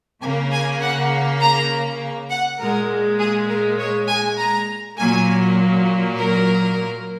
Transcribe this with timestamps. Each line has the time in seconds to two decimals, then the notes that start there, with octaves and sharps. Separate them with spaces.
0.22 C#3 A#3 G#5
0.52 G#5
0.82 F#5
1.40 A#5
2.30 F#5
2.60 A#2 G#3 A#4
3.19 G#4
3.48 A#4
3.79 C#5
4.08 G#5
4.37 A#5
4.97 A#2 F#3 A#3 G#5
6.16 A#4